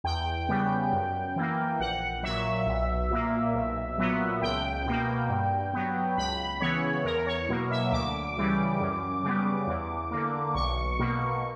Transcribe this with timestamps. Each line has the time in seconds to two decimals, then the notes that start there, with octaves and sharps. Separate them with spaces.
0.04 E2 G5
0.49 C#3 G3 B3
0.93 F#2
1.36 E3 A#3
1.80 A#1 F#5
2.23 A#2 F#3 E5
2.67 B1
3.11 A#2 A#3
3.55 B1
3.98 A#2 F#3 B3
4.42 C#2 G5
4.86 B2 A#3
5.29 G2
5.73 F#3 B3
6.17 C#2 B5
6.60 C#3 E3 B3 C#5
7.05 E2 A#4
7.27 C#5
7.49 B2 F#3 A#3
7.71 E5
7.92 D2 D6
8.37 C#3 E3 G3
8.80 F#2
9.23 C#3 G3 B3
9.67 E2
10.11 D3 A#3
10.54 B1 C#6
10.99 B2 A#3